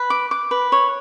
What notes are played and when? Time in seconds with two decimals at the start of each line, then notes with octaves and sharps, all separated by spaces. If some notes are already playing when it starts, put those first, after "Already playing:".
Already playing: B4
0.10 D6
0.31 D6
0.51 B4
0.72 C#5